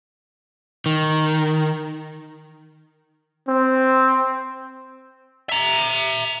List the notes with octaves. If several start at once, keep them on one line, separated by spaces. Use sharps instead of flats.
D#3
C4
E5 A#5